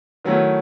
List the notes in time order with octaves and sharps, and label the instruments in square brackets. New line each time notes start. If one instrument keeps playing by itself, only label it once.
[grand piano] D#3 F#3 A3 C#4 E4